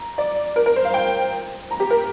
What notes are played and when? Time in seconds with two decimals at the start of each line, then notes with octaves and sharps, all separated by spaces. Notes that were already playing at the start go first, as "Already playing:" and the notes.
Already playing: A#5
0.18 D5
0.56 A#4
0.66 A#4
0.76 C5
0.85 F5
0.94 G5
1.71 A#5
1.80 G4
1.90 A#4